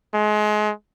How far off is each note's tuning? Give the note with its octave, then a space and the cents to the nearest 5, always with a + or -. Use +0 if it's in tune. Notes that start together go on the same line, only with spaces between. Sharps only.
G#3 +30